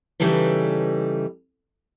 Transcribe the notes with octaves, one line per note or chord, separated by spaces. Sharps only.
C#3 E3 G3 D#4 A4 B4